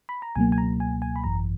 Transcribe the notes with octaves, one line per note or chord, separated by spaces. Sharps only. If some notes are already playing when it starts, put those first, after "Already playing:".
B5
A#5
C#2 B2 F#3 A#3 G#5
G#5
A#5
G#5
G#5
B5
G#1 F#2 E3 A#5